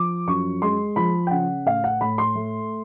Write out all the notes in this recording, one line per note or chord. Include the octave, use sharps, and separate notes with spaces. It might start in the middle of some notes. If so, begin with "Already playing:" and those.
Already playing: F3 D6
F#2 C#6
G#3 C6
F3 B5
G5
C#3 F#5
A2 F5
F#5
A2 B5
C6
A3